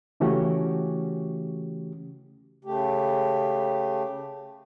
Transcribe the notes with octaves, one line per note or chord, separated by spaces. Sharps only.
C#3 E3 A3 C#4 F#4 G4
C#3 A3 G4